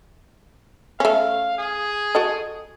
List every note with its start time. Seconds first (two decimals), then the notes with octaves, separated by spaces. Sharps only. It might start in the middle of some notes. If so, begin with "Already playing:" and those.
1.00 A3 C#4 F5
1.58 G#4
2.15 F#4 A4 D#5